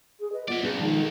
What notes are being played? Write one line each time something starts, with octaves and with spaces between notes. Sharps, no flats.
G#4
B4 D#5
B3 F4 D5 E5
B1 C4 D4 G#4 B4 D5
D#3 F3 G#3
A4